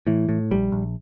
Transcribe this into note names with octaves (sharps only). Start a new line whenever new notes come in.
A2 E3
A2
A#1 G3
A#1